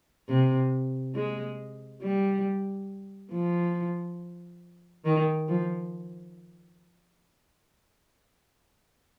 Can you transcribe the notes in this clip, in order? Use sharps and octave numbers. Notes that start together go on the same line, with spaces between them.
C3
G#3
G3
F3
D#3
F3